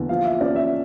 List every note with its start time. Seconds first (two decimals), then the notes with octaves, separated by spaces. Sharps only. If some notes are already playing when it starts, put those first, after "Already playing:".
Already playing: E2 D3
0.09 F3 F5
0.25 E5
0.41 C#4 D5
0.56 E5